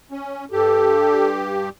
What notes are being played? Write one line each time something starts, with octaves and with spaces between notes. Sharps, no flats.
C#4
G2 G4 A4